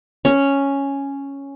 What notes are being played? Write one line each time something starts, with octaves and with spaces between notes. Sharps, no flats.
C#4